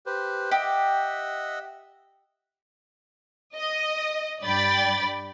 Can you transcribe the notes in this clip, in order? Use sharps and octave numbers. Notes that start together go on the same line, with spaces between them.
G4 B4 C5
G4 D#5 E5 F#5
D#5
G2 D5 G5 B5 A6